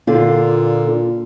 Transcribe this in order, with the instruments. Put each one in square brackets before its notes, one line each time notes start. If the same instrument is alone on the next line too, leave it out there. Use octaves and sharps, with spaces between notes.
[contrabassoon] A#2 [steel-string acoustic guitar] D3 F4